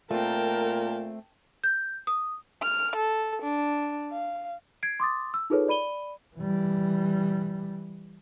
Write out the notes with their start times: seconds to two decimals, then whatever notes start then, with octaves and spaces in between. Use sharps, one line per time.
0.11 A#2 A3 C4 A#4 G5 A5
1.64 G6
2.07 D#6
2.62 F6
2.96 A4
3.42 D4
4.12 F5
4.83 G#6 C7 D7
5.00 C6 D6 D#6 A6
5.34 E6
5.50 D#4 F4 G#4 A4 B4 C#5
5.68 D5 B5 D#7 G7
6.36 E3 G3